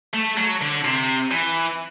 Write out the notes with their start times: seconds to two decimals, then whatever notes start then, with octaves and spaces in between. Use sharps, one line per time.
0.14 A3
0.37 F#3
0.61 D3
0.84 C3
1.31 E3